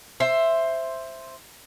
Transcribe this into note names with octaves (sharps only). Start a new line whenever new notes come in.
C5 E5